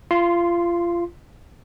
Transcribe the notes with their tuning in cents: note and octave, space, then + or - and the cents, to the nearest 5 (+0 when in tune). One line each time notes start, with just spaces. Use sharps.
F4 -25 C6 +0